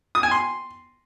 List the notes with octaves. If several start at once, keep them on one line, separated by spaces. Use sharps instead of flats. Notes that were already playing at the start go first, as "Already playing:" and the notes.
D#6
G#5
C6